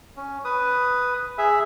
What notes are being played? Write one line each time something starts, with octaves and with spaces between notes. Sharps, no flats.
C#4
B4 D#6
G#4 E5